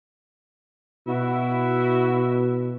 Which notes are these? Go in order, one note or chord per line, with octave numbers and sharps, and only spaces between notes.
B2 E4 F#4